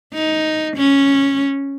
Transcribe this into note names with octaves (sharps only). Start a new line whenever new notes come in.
D#4
C#4